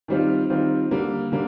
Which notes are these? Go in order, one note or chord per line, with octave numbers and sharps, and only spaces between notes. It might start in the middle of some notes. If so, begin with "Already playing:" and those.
D#3 G3 C4 F4
D#3 G3 C4 F4
D3 G3 A#3
D3 G3 A#3